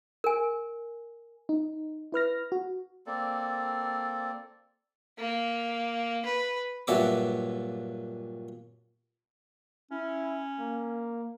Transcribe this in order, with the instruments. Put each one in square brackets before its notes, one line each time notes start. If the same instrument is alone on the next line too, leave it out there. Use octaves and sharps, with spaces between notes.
[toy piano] A#4 G#5
[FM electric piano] D#4
E4 B4 F6 A#6
F#4
[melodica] A#3 C4 A4 D5
[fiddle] A#3
B4
[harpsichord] G2 A#2 F#3 E5 D6
[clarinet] C#4 [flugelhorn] E4
[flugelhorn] A#3